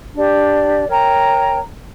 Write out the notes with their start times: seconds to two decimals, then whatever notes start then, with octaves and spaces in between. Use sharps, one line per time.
0.15 D4 G4 D5
0.87 A#4 C#5 G5 A#5